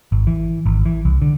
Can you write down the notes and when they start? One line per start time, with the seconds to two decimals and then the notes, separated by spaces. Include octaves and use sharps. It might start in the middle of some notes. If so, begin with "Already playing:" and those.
0.12 G#1
0.27 E3
0.66 G#1
0.86 E3
1.05 C2
1.22 D3